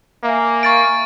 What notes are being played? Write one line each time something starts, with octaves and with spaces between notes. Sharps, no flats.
A#3 E5 F5 G#5
C#6 A6 D7